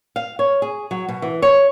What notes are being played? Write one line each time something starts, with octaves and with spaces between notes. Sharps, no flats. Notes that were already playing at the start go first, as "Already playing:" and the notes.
F5
C#5
G#4
F#3
B2
E3
C#5